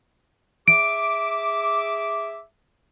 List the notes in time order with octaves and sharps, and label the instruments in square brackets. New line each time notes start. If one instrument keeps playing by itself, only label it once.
[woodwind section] G#4 E5 D6 [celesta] D7